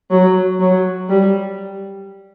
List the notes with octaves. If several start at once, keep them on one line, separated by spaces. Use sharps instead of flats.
F#3
F#3
G3